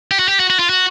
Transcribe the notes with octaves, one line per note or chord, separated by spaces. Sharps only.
G4
F#4
G4
F#4
F#4
F4
F#4